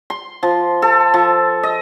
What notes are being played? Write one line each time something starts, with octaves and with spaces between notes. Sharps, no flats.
C6
F3
A4
F3
D#5